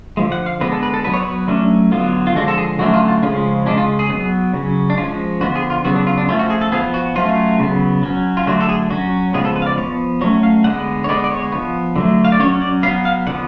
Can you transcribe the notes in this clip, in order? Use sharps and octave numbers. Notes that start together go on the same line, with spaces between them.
D3 F3 G#3
F#5
F5
D3 G#3 B3 B4
A4
B4
A4
F#3 B3 B4
C#5
B4
F#3 A3 C#4 D4
D3 F#3 B3 F4
F4
D3 F3 G#3 F#4
A4
G#4
D3 F#3 A3 C#4 F#4
F4
F4
C#3 F3 G#3 C#4 F4
C#3 G#3 C#4 D4
F4
G#4
F#3 B3
C#3 F#3 C#4
D4
F3 G#3 C#4 F4
D3 F3 B3 F#4
G#4
F4
C#3 F#3 B3 F#4
D4
F4
D4
F3 A3 C#4 F4
F#4
G#4
A4
F3 B3 G#4
F#4
F#3 A3 C#4 F4
C#3 F#3 B3
F#3 C#4
F4
D3 F#3 A3 F#4
A4
G#4
F#3 C#4 F#4
C#3 F3 G#3 B3 G#4
A4
B4
F5
D5
F3 B3 C#5
F#3 A3 C#4 C#5
F5
D3 G#3 B3 F#5
C#5
D3 G#3 B3 D5
D5
C#5
F3 B3
D3 F#3 A3
F5
D5
F#3 C#4 C#5
D5
F#3 B3 F5
F5
D3 F3 B3 F#5